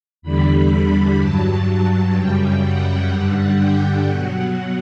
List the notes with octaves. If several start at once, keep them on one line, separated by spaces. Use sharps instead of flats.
E2 D3 G3 B5
G2 F#3 A5
F#2 C#3 G3 G5
F#5
G2 D3 G3 F#5
G5
B2 F#3 F#5